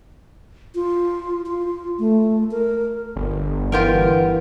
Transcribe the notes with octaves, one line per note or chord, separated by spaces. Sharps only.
F4
F4
A3
A#4
G1
E3 B3 F4 G4 A#4